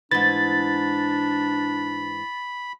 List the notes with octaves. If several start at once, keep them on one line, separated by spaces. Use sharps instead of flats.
G#2 E3 D4 B5 A6